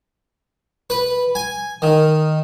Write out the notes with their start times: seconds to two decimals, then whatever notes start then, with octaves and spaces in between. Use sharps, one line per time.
0.90 B4
1.35 G#5
1.82 D#3